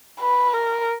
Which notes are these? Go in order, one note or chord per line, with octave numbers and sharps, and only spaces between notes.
B4
A#4